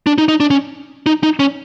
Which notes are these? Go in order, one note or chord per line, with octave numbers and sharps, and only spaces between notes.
D4
D#4
D#4
D4
C#4
D#4
D#4
C#4